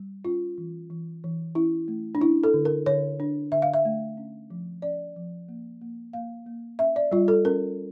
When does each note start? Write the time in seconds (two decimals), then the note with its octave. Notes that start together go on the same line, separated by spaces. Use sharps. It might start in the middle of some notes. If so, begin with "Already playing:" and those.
Already playing: G3
0.25 C#4 F4
0.58 E3
0.90 E3
1.24 E3
1.55 C#4 E4
1.88 A3
2.15 D4
2.21 C#4 E4
2.44 A4
2.54 D3
2.65 A#4
2.86 D3 C#5
3.20 D4
3.52 D3 E5
3.62 F5
3.74 E5
3.85 A3
4.17 C#4
4.50 F3
4.82 C#4 D5
5.16 F3
5.49 A#3
5.81 A#3
6.13 A#3 F5
6.46 A#3
6.79 C#4 E5
6.96 D5
7.12 G3 F4
7.28 A4
7.45 C#4 A#4